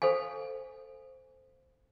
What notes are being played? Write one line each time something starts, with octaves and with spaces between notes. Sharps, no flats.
A4 C5 F5 G#5